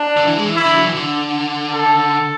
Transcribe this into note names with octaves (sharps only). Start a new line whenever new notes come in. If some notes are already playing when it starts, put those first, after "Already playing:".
Already playing: D4
D3
E3
G#3
E3
E4
D3
F#3
E3
D3
A4